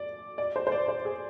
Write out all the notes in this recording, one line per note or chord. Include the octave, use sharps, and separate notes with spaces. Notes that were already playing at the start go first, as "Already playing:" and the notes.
Already playing: D5
D5
C5
C5
D5
C5
G#4